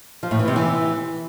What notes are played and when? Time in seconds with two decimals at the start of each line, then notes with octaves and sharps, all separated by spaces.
0.23 F3
0.31 A2
0.39 E3
0.48 C3
0.56 E3